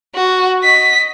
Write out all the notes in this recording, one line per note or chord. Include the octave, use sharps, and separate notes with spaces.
F#4
D#5 B6